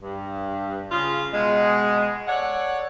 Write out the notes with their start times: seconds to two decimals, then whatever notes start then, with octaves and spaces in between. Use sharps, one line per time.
0.02 G2
0.92 C#3 F4
1.33 B2 G#3
2.28 A4 C#5 D5 F#5